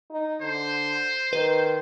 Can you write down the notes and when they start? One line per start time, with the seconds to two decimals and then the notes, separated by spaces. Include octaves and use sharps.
0.10 D#4
0.42 D3 C5
1.33 D#3 B4